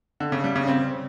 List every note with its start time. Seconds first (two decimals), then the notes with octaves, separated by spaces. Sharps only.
0.20 D3
0.32 C#3
0.44 G3
0.56 C#3
0.67 C4